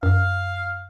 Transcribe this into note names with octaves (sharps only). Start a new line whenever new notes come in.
F#2 F5